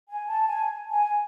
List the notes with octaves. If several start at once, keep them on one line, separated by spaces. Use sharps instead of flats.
G#5
A5
G#5
G#5